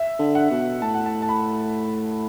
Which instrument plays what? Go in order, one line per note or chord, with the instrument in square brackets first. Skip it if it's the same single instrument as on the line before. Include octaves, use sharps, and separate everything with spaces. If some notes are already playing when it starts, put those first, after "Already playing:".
Already playing: [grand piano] E5
[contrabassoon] D3
[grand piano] F#5
[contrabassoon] B2
[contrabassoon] A2 [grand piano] A5
[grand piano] F#5
A5
A5
B5